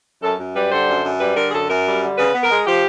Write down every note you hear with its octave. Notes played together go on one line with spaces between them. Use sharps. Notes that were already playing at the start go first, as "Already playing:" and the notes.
F#2 A4
F#2
G3 B4
D3 C5
F#2
F#2
G3 B4
D3 A#4
G#4
F#2 A4
F#2 A#4
G3
D3
C#3 B4
B3
A#4
G#3
F3 G4